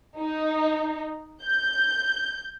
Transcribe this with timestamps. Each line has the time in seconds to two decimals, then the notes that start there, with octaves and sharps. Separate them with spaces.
0.19 D#4
1.44 G6